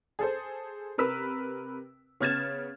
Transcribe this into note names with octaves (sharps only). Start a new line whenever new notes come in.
G#4 A4 C5
C3 A#4 B4 E6 B6
C#3 B3 F6 G#6 A6 E7